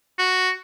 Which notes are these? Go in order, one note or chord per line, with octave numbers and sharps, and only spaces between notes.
F#4